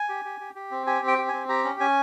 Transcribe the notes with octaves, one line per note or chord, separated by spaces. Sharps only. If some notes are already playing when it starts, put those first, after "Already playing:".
Already playing: G#5
G4
G4
G4
G4
C4
G4 G#5
C4
G5
G4
C4 G#5
G4 A#5
C#4
C#4 G#5